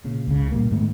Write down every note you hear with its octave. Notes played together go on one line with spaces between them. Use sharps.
A#2 C#3
C#2 C#3
A#2 G3 A#3
G#2 D#3 A3 B3